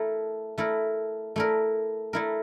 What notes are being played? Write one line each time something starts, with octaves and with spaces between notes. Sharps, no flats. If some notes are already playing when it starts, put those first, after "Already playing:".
Already playing: A3 E4 A#4
A3 E4 A#4
A3 E4 A#4
A3 E4 A#4